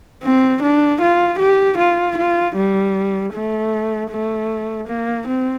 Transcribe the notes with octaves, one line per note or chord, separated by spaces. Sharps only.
C4
D4
F4
G4
F4
F4
G3
A3
A3
A#3
C4